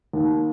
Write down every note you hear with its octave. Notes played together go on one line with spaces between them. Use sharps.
D#2